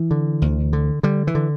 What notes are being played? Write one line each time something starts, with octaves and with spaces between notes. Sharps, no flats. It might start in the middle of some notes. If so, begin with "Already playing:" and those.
Already playing: E3
D3
D2
D3
D3 G3
E3
D3